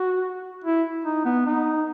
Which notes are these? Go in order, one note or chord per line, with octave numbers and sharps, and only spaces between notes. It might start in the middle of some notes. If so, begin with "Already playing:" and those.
Already playing: F#4
E4
D#4
B3
D#4